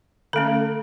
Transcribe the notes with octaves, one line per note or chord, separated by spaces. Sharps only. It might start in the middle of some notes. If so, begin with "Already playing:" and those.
D3 A3 C#4 A4